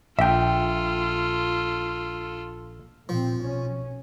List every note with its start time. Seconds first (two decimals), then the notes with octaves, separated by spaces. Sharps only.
0.19 A#1 F4 A4 E5 G5
3.09 A#2 F3 C4
3.41 B1 C#4